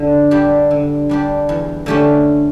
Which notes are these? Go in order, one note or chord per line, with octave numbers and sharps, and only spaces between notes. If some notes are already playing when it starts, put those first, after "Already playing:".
Already playing: D3
G3 D4 G4
D3
G3 D4 G4
E2
D3 A3 C#4 G4